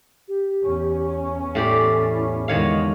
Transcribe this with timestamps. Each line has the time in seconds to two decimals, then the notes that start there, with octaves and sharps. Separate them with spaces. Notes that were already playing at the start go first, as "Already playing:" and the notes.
0.28 G4
0.62 E2 C#4
1.55 A2 E4 G4 D5
2.48 E2 D3 D#3 G#3 C#5 F5